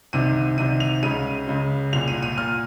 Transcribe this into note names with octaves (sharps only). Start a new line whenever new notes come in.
C2 C3 D#3 D#7
C2 C3 D#3 D#7
F7
C#2 C#3 D#7
C#2 C#3
C2 A#2 F7
D#7
D#7
A#2 F6